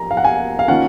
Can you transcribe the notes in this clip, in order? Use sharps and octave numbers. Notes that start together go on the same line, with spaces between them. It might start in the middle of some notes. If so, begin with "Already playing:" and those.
Already playing: F3 A#5
F5
F#5
G#5
F5
D#3 A#3 C#4 F4 F#5